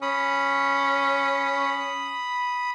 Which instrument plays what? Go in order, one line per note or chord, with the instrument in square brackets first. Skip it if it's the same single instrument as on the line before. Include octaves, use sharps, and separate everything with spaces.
[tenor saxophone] C#4 [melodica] B5 D#6